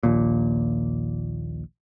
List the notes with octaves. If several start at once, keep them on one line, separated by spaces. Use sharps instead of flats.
A#1 D#2 A#2